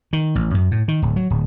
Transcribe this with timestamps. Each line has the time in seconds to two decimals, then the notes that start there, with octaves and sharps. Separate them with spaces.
0.13 D#3
0.35 A1
0.54 F#2
0.71 A2
0.88 D#3
1.02 D1
1.16 F#3
1.30 D1